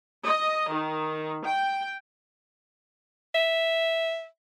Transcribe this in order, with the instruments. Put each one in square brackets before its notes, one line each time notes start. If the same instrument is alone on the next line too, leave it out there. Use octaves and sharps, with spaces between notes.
[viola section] D#5
D#3
G5
[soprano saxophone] E5